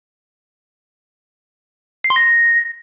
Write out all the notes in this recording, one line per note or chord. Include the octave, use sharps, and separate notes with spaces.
C7
C6
A#6